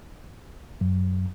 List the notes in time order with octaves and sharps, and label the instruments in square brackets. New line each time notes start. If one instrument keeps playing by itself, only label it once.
[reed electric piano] F#2